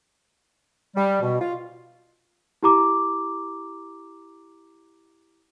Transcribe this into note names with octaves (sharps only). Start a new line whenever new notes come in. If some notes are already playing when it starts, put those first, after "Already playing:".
G3
B2
F4
E4 G4 A#5 D6